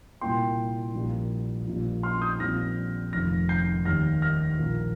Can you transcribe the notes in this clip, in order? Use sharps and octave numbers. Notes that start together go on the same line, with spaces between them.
C2 A#2 A#3 G5 C6
A#1 A#2 G3 A#3
A#1 A#2 G3
C6 F6
D#6 G6
A#1 A#2 G3 C4 F6 A#6
F1 F2 D#3 F6 A#6
G6 C7
D#2 D#3 G3 A#3 F6 A#6
F6 A#6
A#1 A#2 F3 A#3